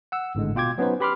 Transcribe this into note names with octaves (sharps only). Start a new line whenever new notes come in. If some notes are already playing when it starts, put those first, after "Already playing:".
F#5 E6
G#1 A2 D3 G#3
B2 F4 G5 D6 G#6
F#3 B3 C#4 D#4 B4 C5
G4 B4 B5 C6 D6 F6